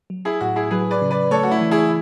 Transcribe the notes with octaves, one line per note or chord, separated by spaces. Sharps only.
F#3
E4 G#4
A2 F#4
E4 G#4
F#3 G#4 B4
B4 D5
C#3
B4 D5
A3 A4 C#5
F#4
E4
E3
E4 G#4